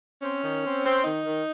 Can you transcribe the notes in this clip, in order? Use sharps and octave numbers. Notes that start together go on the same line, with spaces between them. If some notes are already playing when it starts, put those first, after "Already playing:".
C4 C#4
D#3
C4
C4
D#3 D#4
D#3